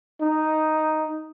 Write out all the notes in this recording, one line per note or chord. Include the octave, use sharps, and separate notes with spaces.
D#4